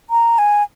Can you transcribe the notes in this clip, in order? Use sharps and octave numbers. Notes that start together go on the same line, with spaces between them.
A#5
G#5